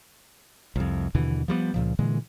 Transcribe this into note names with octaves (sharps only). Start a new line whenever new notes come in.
C2 F2
D#2 B2 D3 E3
F3 G3 G#3 B3
C#2 A#2 F3
A#2 D3 E3 G#3